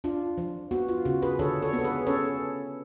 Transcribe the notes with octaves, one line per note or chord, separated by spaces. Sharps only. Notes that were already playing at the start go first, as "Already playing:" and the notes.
D4 F4
F3
B3 F#4
F4
C#3 F#4
G#4 B4
D3 A4 C#5
A4 C#5
B3
A4
G#4 B4
C#4 A4 C#5